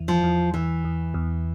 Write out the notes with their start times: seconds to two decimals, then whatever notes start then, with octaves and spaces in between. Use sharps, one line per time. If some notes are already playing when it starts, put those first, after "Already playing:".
Already playing: E2 E3
0.08 F3
0.23 E2
0.54 E2 E3
0.84 E2
1.14 E2